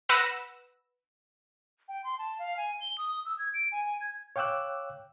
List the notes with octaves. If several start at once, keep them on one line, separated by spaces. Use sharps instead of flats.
B4 F#5 E6 A#6
G5
C6
A5
F5
G#5
G7
D#6
E6
G#6
D7
G#5
G#6
C#5 F5 G5 D6 E6 F#6